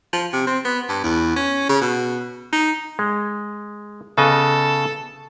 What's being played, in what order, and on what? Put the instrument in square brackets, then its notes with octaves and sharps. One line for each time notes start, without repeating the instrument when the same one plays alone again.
[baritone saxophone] F3
C3
C4
B3
G2
E2
C#4
C#3
B2
D#4
[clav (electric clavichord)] G#3
[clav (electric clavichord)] C#3 B3 D#5 [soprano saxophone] A4